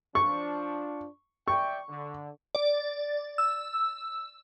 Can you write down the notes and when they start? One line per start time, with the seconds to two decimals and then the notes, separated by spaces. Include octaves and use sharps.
0.15 F3 D4 C#6
1.48 D5 E5 G5 C#6
1.89 D3
2.55 D5
3.38 E6